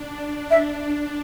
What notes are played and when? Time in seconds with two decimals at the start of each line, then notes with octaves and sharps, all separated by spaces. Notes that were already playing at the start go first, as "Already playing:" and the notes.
Already playing: D4
0.13 D4
0.51 E5